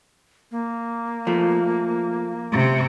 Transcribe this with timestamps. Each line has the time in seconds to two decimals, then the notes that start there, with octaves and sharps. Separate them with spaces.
0.51 A#3
1.27 F3 A3
2.52 C3